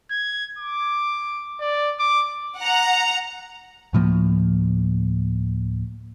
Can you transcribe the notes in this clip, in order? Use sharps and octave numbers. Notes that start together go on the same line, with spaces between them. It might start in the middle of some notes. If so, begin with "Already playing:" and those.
G#6
D6
D5
D6
F#5 A#5
D2 A2 F3 A#3